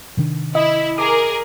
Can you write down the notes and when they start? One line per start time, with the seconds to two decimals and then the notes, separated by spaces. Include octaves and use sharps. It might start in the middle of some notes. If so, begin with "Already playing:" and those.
0.17 C3 D#3 D4
0.55 E4 D#5
0.98 G#4 A#4 D6